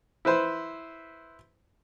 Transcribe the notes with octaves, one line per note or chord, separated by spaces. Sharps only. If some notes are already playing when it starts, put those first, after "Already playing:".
E4 B4 C5